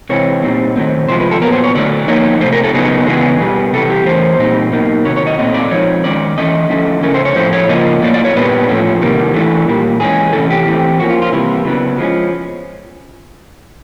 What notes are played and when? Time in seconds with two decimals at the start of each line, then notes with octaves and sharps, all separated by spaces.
0.09 C3 E3 G#3 C4 C#5
0.43 A#2 G3 C4 D#4
0.76 D#3 F#3 A3 C4
1.08 C3 F3 G#3 C5
1.20 B4
1.31 A4
1.41 A#2 F#3 B3 A#4
1.52 C5
1.64 C#5
1.75 D3 F#3 A3 D4 D5
2.08 F3 A#3 D#4 C#5
2.41 C3 E3 A3 C5
2.53 A#4
2.63 A4
2.74 C#3 F#3 B3 D#4 G#4
3.07 C#3 E3 G#3 B3 D4 G#4
3.40 B2 G3 B3
3.73 C3 E3 G3 A4
3.90 G4
4.05 E3 A3 C#4 C5
4.38 A#2 G3 C4 D#4
4.73 B2 F#3 A#3 D#4
5.05 C3 D#3 F#3 C#5
5.16 C#5
5.27 D#5
5.39 A#2 F#3 A3 C4 D#5
5.54 D5
5.71 F3 G#3 C4 D#4 C#5
6.04 D#3 G#3 C#4 D5
6.38 E3 A3 C#4 D#5
6.70 D3 F3 A3 C#4
7.03 C#3 F3 A3 C#4 A#4
7.14 C5
7.25 C#5
7.36 A2 F3 A3 C5
7.53 C#5
7.69 C#3 F3 A#3 D#5
8.02 A2 F#3 A#3 D5
8.14 D5
8.25 C#5
8.36 A#2 G3 B3 D4 B4
8.68 A2 F3 A3 C#4
9.01 C3 D#3 G3 A#3
9.34 E3 A3 D4
9.68 A#2 G3 A#3
10.00 E3 G#3 C#4 G#4
10.33 C3 E3 A3 C#4 A4
10.50 G4
10.67 E3 A3 C4
10.99 F3 A#3 C#4 F#4
11.10 F4
11.22 F4
11.32 C3 E3 G3 A#3 E4
11.65 C#3 F#3 B3 D4
11.98 F3 G#3 C#4